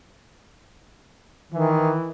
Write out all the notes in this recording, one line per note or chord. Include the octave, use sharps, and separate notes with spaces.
D#3 E3